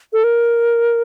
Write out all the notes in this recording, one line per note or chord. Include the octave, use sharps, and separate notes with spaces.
A4
A#4